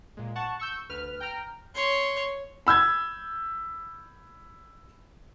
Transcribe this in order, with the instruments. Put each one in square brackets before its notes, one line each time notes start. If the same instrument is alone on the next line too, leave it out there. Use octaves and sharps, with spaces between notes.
[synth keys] A#2 G#3
F#5 A5 C#6
C#6 E6 G6
D2 B4 F6
G5 A#5 F6
[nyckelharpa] C#5 C6
[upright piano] B5 E6 G6 G#6